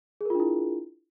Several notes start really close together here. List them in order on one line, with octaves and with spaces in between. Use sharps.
G#4 A#4 F4 D4 E4